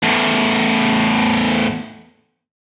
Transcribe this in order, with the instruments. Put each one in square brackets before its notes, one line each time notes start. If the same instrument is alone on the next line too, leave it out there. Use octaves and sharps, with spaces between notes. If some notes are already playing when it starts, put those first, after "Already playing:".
[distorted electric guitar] E2 A2